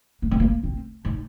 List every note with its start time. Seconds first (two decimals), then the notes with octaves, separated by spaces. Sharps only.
0.22 A#3
0.31 C4
0.40 A#3
0.63 C4
1.05 D#4